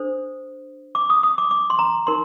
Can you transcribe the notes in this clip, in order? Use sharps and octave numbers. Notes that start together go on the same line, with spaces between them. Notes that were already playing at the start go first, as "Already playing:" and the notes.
Already playing: D4 A4 C5
D6
D#6
D#6
D6
D6
C6
A#5
D#4 A#4 C6